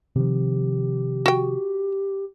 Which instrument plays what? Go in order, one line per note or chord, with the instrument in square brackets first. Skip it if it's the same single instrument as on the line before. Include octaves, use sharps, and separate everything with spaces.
[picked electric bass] C3 D#3 F3 [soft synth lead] G4
[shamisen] F#4 G5